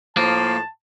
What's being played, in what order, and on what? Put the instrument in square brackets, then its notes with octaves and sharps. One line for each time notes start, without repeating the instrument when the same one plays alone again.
[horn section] A2 F3 [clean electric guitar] A#3 [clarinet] A5